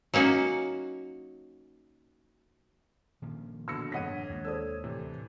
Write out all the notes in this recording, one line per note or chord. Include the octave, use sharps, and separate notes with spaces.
F#3 A#3 C#4 D#4 F#4
A#2 D#3 F3
B2 D3 E6 A#6 C#7
G1 F2 C#5 D#5 F#5 B6 D#7
D#2 G#3 A#3
A4 C5 D5 D#6 E6
D2 A2 C3 E3